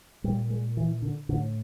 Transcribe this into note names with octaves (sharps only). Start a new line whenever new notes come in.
A#2 G3
G#3
E3
D3
A2 D3